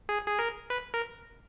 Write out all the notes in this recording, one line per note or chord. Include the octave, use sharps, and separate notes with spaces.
G#4
G#4
A#4
B4
A#4